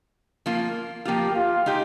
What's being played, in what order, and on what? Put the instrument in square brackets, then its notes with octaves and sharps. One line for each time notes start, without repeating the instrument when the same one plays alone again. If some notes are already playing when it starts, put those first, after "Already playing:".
[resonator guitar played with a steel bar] F3 A#3 F4
[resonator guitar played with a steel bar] F3 A#3 F4 [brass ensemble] G4
[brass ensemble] F4
[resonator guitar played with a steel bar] G#3 D#4 G4